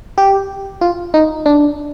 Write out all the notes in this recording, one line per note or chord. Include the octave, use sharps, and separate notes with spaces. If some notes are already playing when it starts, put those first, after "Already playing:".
G4
F4
D#4
D4